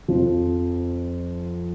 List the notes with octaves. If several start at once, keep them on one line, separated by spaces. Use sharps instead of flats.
F2 F3